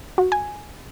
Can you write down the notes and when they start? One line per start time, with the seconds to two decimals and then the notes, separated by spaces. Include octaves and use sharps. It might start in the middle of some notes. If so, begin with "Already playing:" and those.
0.18 F#4
0.32 G#5